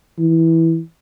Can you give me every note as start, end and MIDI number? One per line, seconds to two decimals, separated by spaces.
0.18 0.79 52